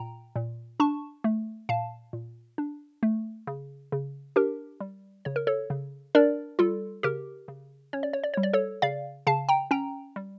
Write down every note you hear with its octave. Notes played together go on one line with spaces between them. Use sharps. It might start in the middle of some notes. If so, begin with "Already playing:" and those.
Already playing: A#2 G5 A#5
A#2
D4 A5 C#6
A3
A#2 F5 A5
A#2
D4
A3
C#3
C#3
D4 G4 A#4
G3
C#3 C#5
A#4
A4 C#5
C#3
D4 A#4 D5
G3 F4 A4
C#3 G4 A#4
C#3
C#4 C#5
D5
C#5
D5
G3 C#5
D5
A4 C#5
C#3 D5 F5
C#3 F5 A5
G5 A#5
C#4 G5 A#5
G3